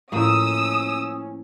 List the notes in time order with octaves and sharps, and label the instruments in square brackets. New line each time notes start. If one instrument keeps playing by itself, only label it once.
[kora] A2 F3 A#3 [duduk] C#4 [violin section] D#6 E6